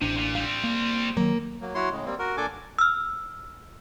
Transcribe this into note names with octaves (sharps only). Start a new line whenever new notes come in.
A1 C3 D4
A#2
G3 C4 F5
A#3
D#3 F#3 A#3
F#3 A#3
F#3 E4 F#4 C#5 C6
A2 C#3 G#3
G3 A#3 C4
F#4 A#4
A#2 D4 A4 G#5 D6
E6 F6